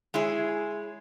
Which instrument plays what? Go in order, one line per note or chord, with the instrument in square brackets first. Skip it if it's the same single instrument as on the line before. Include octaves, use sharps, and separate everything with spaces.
[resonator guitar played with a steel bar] G#3 E4 G#4 C#5